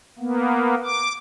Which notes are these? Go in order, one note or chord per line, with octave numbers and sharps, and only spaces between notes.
A#3 B3
D6